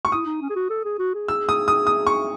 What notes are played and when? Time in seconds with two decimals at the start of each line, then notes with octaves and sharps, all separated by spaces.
0.05 C#6
0.12 E4 D#6
0.26 D#4
0.42 C#4
0.50 G#4
0.56 F#4
0.70 A4
0.85 G#4
0.99 F#4
1.15 G#4
1.28 E6
1.49 D#6
1.68 D#6
1.87 D#6
2.07 C#6